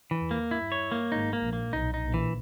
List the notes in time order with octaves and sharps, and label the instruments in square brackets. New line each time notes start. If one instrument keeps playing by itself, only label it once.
[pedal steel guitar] E3
[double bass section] E2
[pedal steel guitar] A#3
[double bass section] G2 [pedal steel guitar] E4
[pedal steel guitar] C#5
A#3
[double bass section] G#1 G#2 [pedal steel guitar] D#4
[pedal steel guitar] A#3
[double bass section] A#1 A#2
[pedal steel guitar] A#3
[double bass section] B1 B2 [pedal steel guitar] D#4
[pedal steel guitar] D#4
[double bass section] A#1 A#2
[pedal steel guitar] E3